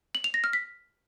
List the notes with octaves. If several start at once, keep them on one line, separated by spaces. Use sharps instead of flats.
F#7
F7
A#6
F6
B6